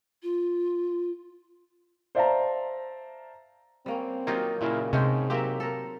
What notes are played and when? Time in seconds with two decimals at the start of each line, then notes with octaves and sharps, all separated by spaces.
0.23 F4
2.15 C5 D5 E5 F5 A5 A#5
3.86 G3 A#3 C4 C#4
4.27 D#3 F#3 A#3 D#4 F4 G4
4.61 A#2 C#3 A#3 E4
4.93 G#2 C3 G#3 A3 C#4 C5 G5
5.30 F#3 A#3 C4 G4 E5
5.60 A4 A#4